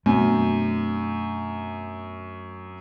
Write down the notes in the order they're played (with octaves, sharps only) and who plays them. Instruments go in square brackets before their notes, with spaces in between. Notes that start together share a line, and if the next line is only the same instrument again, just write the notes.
[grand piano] F#2 [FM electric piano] B2 [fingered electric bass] A3 C4 D4